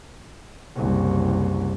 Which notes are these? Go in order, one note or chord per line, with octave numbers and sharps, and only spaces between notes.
F#1 C2